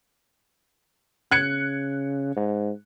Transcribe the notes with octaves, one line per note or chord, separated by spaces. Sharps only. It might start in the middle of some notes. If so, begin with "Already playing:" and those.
C#3 F#6 G#6 C#7
G#2